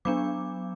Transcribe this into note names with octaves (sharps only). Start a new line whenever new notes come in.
F#3 B3 D4 D6